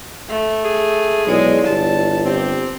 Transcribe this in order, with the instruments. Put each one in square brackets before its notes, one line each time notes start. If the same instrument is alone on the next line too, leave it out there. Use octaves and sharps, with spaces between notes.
[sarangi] A3
[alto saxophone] G#4
[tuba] B1 [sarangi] G#3 [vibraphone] E4 C#5 D5
[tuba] G1 [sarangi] A5
[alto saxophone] C4 [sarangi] G4